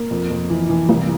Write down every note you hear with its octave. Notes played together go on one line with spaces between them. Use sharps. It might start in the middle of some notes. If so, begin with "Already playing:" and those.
Already playing: A#3
F2
F2
E3
E3
C2